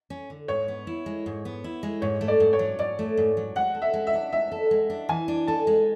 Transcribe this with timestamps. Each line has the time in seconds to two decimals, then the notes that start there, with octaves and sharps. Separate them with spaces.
0.10 C#4
0.30 D3
0.48 G#2 C#5
0.68 B3
0.87 E4
1.06 G#3
1.26 G#2
1.45 B3
1.64 E4
1.83 G#3
2.02 G#2 C#5
2.21 A3
2.28 D5
2.40 G#2
2.53 C#5
2.59 F#3
2.79 G#2 D5
2.99 A3
3.17 G#2
3.37 F#3
3.56 G#3 F#5
3.75 A4
3.82 E5
3.94 G#3
4.07 E5
4.14 D4
4.32 G#3 E5
4.51 A4
4.71 G#3
4.90 D4
5.09 E3 G#5
5.28 D4
5.48 A4 A5
5.67 G#3